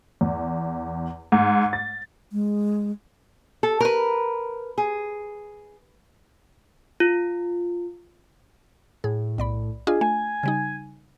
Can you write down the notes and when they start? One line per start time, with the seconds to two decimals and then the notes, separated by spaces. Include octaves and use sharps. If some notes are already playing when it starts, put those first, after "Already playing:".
0.21 E2
1.32 G#2
1.73 A6
2.31 G#3
3.63 A4
3.80 A#4 B4
4.78 G#4
7.00 F4
9.04 A2 G#4
9.38 B1 D5 B5
9.87 D4 F4 G#4 D#5
10.01 A3 G#5
10.43 C#3 G3 D#4